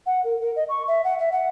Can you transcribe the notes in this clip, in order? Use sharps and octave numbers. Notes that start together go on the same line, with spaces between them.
F#5
A#4
A#4
D#5
C#6
E5
F#5
E5
F#5